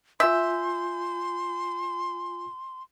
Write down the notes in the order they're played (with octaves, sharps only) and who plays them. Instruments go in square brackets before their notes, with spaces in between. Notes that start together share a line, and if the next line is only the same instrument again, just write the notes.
[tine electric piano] F4 G#5 G6 [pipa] E5 [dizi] C6